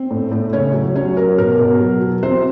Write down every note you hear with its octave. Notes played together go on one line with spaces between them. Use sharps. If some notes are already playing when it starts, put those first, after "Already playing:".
Already playing: C4
A2
A2
C#3 C#4 C#5
F#3
F#3 C#4 C#5
F#3 A#4
B2 A#4
B2
F#3
F#3
E3 C4 C5